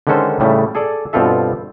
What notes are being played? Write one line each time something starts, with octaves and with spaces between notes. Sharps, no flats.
D3 D#3 G#3 C#4 A4 C5
A2 C#3 G3 A3
G#4 A4 D5
G2 B2 C4 F4 A4 E5